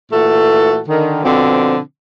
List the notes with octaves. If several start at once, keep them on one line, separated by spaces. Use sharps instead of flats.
A#2 E3 A3 F#4 A4
D3 D#3
B2 D3 F3 C4